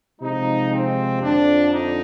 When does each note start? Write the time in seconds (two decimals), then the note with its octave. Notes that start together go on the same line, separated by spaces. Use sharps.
0.21 C3 F3 G#3 D#4
0.72 C4
1.21 F2 D3 F3 D4
1.72 D#4